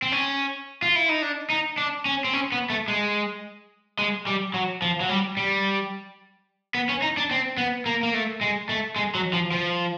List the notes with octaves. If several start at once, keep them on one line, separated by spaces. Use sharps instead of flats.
C4
C#4
F4
E4
D#4
D4
D#4
D4
C#4
C4
C#4
B3
A3
G#3
G#3
G3
F#3
F3
F#3
G3
G3
B3
C#4
D#4
D4
C4
B3
A#3
A#3
A3
G#3
A3
G#3
F#3
F3
F3